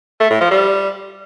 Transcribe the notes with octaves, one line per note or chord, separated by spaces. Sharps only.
A3
A2
F3
G3